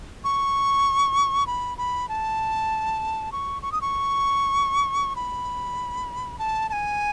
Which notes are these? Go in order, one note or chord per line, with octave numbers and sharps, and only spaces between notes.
C#6
B5
B5
A5
C#6
C#6
D#6
C#6
B5
A5
A5
G#5